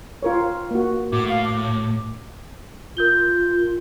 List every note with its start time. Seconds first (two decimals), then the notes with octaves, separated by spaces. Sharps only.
0.23 F4 A#4 C#5
0.71 A#3 F#4
1.12 A2 F#4 D6
1.29 F5
1.45 D6
2.97 F4 A#4 G6 G7